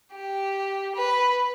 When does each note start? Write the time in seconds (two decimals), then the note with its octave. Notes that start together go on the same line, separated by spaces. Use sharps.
0.14 G4
0.95 B4